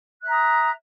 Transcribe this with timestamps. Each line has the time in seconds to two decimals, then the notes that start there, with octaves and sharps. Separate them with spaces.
0.21 F#6
0.24 E5
0.27 A#5
0.30 D#6